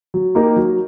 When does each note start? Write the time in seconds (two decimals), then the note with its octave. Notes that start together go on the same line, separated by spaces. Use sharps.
0.14 F#3
0.35 A#3 D#4 G4 A#4
0.56 F#3